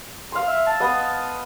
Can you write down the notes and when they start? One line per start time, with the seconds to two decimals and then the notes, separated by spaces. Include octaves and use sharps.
0.32 F5 C6
0.47 E5
0.67 A5
0.80 B3 D#5